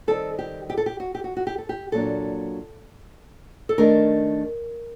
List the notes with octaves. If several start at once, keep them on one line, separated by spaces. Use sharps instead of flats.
D#3 G3 C4 A4
G4
G4
A4
G4
F#4
G4
F#4
F#4
G4
A4
G4
A#2 F#3 A#3 D4 A4
A4
D#3 A3 D4 A#4